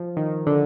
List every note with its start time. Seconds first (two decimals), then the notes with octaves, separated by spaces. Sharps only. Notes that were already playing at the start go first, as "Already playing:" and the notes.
Already playing: F3
0.17 D#3
0.47 D3